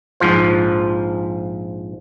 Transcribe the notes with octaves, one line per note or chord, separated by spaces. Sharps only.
A#1 G#2 F3 F4 C5